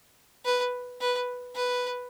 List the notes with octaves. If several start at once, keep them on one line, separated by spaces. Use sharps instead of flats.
B4
B4
B4